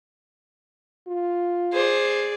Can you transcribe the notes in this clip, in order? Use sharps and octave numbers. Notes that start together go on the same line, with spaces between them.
F4
G#4 C5 D5